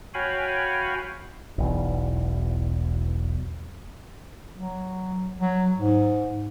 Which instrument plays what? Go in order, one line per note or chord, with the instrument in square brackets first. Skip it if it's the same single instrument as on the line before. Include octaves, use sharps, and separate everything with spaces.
[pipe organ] F#4 C#5 F5 G5 G#5 B5
[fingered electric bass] E1 B1 E2
[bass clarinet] F#3
F#3
G#2